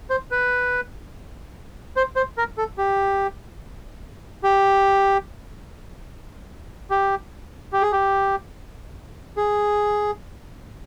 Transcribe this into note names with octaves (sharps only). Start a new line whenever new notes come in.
C5
B4
C5
C5
A#4
A4
G4
G4
G4
G4
G#4
G4
G#4